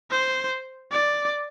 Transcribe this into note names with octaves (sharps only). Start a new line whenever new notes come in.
C5
D5